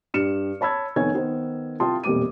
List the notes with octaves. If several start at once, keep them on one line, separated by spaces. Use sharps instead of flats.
G2 G4 F6 C#7 E7
C#5 A5 B5 E6 G#6
F1 D#3 B3 C#5 G#5 G#6
D#3 B3 D#4 C5
C2 F4 G5 A5 C6 D#6
E1 F2 A#2 G3 D6 D#7